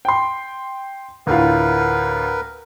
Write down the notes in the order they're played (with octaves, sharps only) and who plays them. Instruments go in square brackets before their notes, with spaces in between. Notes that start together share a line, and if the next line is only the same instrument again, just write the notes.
[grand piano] G5 C6
[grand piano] D2 A2 F4 [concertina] A#4 B4